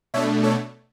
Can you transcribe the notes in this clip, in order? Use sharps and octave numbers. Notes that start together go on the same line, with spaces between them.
B2 A3 D4 C#5 E5
A4 C#5